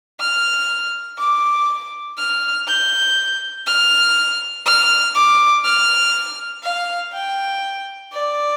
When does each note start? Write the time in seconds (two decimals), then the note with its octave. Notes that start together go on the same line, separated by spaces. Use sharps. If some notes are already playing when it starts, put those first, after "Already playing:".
0.20 F6
1.18 D6
2.18 F6
2.67 G6
3.66 F6
4.66 F6
5.15 D6
5.65 F6
6.63 F5
7.13 G5
8.13 D5